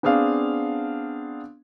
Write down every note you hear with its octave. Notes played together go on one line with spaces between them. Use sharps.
B3 C4 D4 G#4 F5